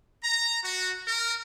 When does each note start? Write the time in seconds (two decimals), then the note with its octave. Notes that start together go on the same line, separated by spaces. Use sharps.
0.23 A#5
0.62 F#4
1.07 A#4